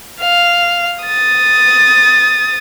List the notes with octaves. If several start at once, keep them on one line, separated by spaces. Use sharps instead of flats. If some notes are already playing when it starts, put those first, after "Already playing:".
F5
D#6 A6